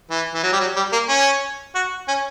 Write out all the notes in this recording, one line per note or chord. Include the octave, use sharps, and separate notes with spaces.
E3
E3
F#3
G3
F#3
G3
A#3
C#4
F#4
C#4